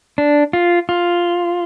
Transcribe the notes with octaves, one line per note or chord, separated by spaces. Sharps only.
D4
F4
F4